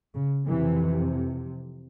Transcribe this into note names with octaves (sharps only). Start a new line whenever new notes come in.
C#3
F2 C3 E3